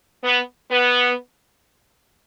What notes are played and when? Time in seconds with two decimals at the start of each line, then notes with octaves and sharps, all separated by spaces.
0.23 B3
0.70 B3